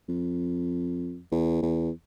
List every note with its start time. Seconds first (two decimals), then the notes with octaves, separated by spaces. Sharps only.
0.09 F2
1.32 E2
1.62 E2